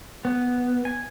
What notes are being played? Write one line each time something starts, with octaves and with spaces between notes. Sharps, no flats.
B3
G#5